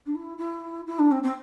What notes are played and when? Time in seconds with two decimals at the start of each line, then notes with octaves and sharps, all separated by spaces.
0.06 D4
0.15 E4
0.38 E4
0.87 E4
0.99 D4
1.11 C4
1.23 C4